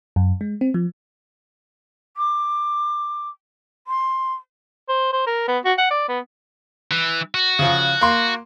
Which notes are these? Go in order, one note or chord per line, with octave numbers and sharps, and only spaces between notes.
F#2
G#3
C4
F3
D6
C6
C5
C5
A#4
B3
F#4
F#5
D5
B3
E3
F#4
C#3 F3
A#3 C6